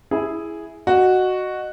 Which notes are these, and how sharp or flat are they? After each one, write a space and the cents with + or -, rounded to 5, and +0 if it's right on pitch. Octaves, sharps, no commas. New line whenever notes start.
E4 +0 G#4 +0 G#5 +0
F#4 +0 D#5 -20